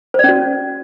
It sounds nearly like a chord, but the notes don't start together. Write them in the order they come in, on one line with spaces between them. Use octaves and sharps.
C5 D5 C#4 F#4